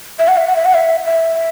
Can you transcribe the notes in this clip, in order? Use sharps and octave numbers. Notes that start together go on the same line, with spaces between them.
E5
F#5
E5
F#5
E5
F#5
E5
E5